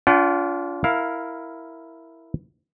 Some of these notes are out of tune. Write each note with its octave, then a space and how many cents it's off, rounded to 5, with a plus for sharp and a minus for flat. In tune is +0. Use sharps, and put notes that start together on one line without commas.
D4 -45 F4 +0 F#5 +40
E4 +0 A#4 -10 F5 +10